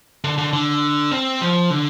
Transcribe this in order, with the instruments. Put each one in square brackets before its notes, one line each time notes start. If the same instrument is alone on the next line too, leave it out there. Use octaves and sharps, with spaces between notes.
[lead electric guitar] D3
D3
D3
C4
F3
D3